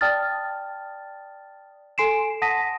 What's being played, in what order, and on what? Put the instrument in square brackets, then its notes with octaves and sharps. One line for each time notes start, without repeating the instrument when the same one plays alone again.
[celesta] D5 G5 A5 D#6 F6 A6
A4 G#5 C6 C7 D7 E7
F#5 A5 D#6 A#6 B6 D#7